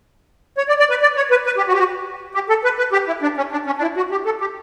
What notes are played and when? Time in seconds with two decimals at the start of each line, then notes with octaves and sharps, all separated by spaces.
0.58 C#5
0.69 D5
0.79 D5
0.90 B4
1.02 D5
1.17 C#5
1.31 B4
1.46 B4
1.57 G4
1.68 F#4
1.74 G4
1.79 F#4
2.34 G4
2.49 A4
2.64 B4
2.78 B4
2.93 G4
3.07 E4
3.22 D4
3.37 C#4
3.52 D4
3.66 C#4
3.78 D4
3.82 E4
3.97 F#4
4.11 G4
4.25 A4
4.41 G4